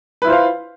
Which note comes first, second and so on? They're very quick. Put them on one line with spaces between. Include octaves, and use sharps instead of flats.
B4 E4 F4 C5 F5